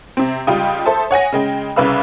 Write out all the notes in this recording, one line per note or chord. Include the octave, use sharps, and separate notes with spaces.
C3 C4
C#2 G3 F4 G5 D#6
A4 C5 E5 A5
C#5 F#5 G#5 A#6
C#3 G#3 G5
C2 C#3 B4 F5 B5 E6